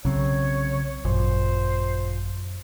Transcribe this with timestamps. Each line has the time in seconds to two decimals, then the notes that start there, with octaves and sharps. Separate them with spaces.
0.05 B1 C#3 F#3 C4 C#5
1.05 G#1 F#2 A#2 C5